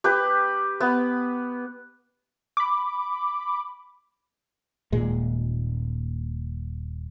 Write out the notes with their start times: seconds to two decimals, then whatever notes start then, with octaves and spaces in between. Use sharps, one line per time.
0.04 G4 B4
0.80 B3
2.57 B5 D6
4.92 D#1 A#2 G#3